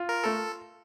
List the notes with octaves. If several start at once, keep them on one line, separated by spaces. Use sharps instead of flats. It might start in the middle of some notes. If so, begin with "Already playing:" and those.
Already playing: F4
A#4
A3 A4